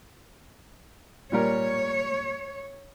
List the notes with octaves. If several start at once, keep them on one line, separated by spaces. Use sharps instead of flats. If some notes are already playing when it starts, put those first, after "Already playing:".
A#2 G3 A#4 C#5